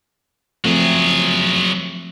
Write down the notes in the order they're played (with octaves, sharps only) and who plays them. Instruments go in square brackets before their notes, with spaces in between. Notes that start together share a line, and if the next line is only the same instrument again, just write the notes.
[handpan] F3 A3 C4 [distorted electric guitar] F#3 G#4